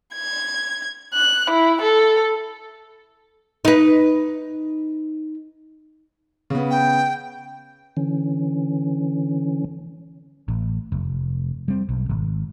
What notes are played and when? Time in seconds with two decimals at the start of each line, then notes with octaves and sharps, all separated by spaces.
0.14 G#6
1.14 F#6
1.50 E4
1.81 A4
3.65 D#4 B4
6.50 C#3 B3
6.70 G5
7.97 D3 E3 C#4
10.48 A1
10.92 F1
11.68 G3 C4
11.89 B1
12.09 G#1